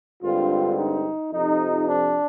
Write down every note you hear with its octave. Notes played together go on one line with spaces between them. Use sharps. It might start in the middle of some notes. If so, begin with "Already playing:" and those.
G2 D3 G#3 C4 F4
D#4
F2 C3 F3 D#4
D4